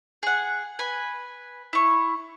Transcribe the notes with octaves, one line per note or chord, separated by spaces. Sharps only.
G#4 F#5
B4 G#5
E4 C#6